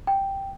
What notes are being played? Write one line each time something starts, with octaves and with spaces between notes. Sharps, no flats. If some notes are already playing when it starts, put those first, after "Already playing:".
G5